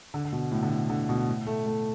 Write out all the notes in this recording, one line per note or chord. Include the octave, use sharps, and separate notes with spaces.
D3
D3
B2
A2
D3
B2
D3
B2
A2
A3
A3